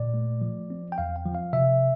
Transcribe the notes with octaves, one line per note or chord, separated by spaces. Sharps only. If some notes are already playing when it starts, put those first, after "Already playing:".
Already playing: A#2 D5
A3
F3
C4
G5
E2 F5
G5
F3
F5
C3 E5